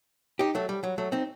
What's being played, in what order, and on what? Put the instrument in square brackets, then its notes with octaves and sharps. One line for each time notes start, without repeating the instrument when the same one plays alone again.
[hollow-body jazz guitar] D#4 G4
F#3 A3
G3
F#3
F#3 A3
C4 D#4